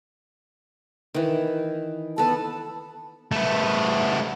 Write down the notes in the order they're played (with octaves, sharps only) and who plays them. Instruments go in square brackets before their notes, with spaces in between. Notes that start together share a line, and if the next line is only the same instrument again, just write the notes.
[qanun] D#3 E3
[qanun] B3 A4 [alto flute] A5
[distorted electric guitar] A3 B3